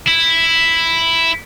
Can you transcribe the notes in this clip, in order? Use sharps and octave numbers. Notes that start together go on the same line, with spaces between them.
E4